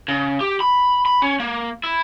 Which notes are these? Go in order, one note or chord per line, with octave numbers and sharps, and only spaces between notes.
C#3
G4
B5
B5
C#4
A#3
E4